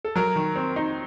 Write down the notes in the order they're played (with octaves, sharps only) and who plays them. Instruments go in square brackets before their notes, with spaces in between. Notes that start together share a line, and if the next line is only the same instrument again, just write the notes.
[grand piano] A4
[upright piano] F#3 [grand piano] A#4
[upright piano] D#3
C4
D#4